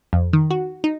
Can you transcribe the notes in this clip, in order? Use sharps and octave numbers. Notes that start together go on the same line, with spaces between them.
F2
D#3
F#4
D#4